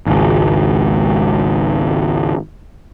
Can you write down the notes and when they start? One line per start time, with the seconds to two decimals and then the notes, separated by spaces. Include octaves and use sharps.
0.06 G#1 C#2